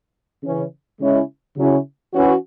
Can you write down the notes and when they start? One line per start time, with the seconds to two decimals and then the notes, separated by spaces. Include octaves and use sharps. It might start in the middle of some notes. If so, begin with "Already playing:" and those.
0.43 C#3 E3 C#4
1.00 C#3 G#3 C#4 E4
1.57 C#3 F#3 C#4 E4
2.14 E3 C#4 F#4